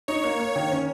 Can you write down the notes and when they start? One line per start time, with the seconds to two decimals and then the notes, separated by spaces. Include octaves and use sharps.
0.08 D#4 C#5
0.24 A#3
0.40 A#3
0.56 D#3
0.71 C#4